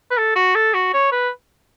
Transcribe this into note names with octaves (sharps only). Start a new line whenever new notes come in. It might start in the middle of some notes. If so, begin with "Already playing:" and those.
B4
A4
F#4
A4
F#4
C#5
B4